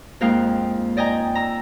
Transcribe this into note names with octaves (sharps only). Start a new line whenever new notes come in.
F2 G#3 A#3 D#4 F5 G5
D5 D#5 G5 G#5 A#5
A#5 E6